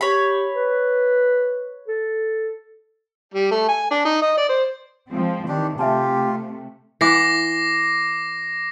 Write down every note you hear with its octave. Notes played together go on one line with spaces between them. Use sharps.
G4 C#5 B5
B4
A4
G3
A3
G#5
D4
D#4
D#5
D5
C5
F3 G#3 C4
D#3 E3 D4 G4
C3 A3 F4 G4 E5 G#5 A5
E3 F#5 D6 A#6 C7